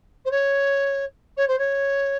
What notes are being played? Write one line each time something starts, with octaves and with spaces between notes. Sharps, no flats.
C5
C#5
C#5
C5
C#5